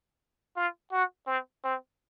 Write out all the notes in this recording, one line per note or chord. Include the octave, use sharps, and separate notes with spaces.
F4
F#4
C4
C4